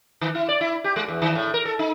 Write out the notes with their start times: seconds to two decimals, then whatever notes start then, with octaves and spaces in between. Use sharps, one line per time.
0.21 D#3
0.35 E4
0.49 D5
0.61 E4
0.84 G4
0.96 G#3
1.08 E2
1.22 D#3
1.35 A2
1.54 A#4
1.65 A4
1.79 D#4